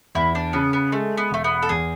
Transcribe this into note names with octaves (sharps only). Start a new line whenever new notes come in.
E2 E4
D4
C#3 B3
B3
G#3 A3
B3
E1 A3
B3
A4
E2 G#4